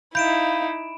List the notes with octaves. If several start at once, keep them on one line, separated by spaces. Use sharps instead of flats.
D#4 E4 F5 B5 G6 D7 E7